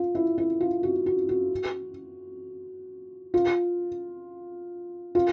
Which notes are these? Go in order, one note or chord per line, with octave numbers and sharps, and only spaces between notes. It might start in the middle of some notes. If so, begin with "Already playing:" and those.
Already playing: F4
E4
E4
F4
F#4
F#4
F#4
F4
F4